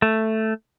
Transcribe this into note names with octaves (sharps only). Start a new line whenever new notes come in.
A3